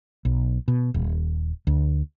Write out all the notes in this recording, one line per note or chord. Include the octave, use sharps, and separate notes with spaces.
B1
B2
D#1
D2